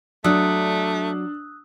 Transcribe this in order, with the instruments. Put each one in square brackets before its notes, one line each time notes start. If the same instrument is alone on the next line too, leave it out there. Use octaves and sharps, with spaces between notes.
[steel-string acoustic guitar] F#3 [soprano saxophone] A3 [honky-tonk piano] D4 [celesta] D#6 E6 F#6